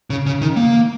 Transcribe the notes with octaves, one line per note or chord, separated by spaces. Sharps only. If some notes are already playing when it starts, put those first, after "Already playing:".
C#3
C#3
D#3
A#3